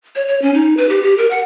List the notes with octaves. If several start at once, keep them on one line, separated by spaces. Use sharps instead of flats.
C#5
C#5
C#4
D#4
B4
G4
G4
A#4
F#5